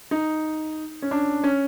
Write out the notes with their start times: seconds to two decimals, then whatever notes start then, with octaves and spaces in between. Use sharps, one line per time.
0.11 D#4
1.02 C#4
1.11 D4
1.44 C#4